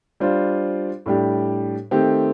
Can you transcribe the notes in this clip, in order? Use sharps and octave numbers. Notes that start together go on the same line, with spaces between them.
G3 D4 F4 C5
A2 G3 D4 G4
D#3 A3 C4 G4